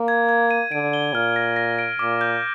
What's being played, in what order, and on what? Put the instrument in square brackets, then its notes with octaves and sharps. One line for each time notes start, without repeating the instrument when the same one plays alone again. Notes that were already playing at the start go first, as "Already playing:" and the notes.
Already playing: [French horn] A#3
[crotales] G#6
G#6
D#7
[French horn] D3 [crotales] D7
[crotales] G7
[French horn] A#2 [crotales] F6
[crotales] A#6
A#6
D7
[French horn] A#2 [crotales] D6
[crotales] G6